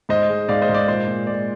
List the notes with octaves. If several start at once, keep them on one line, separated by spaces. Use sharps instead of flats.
G#2 C5 D#5
G#3
G#2 D5 F5
C5 D#5
G#2
D5
A#2 C5
A#2
G#3 D5